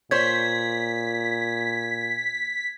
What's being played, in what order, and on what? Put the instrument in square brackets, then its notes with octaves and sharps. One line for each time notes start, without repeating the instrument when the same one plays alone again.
[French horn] A#2 [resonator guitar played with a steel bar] C5 C#5 [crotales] G#6 [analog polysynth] B6